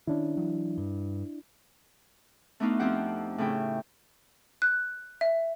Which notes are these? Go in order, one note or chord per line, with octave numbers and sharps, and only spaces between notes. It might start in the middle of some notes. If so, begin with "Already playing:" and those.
D#3 C#4 D4 E4
E3 F#3
G2
A3 B3 D4 D#4 F4 F#4
F2 F3 C4 G4 F#5
A2 C#3 E4 G5
F#6
E5